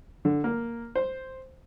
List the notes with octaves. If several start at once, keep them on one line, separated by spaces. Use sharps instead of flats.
D3
A#3
C5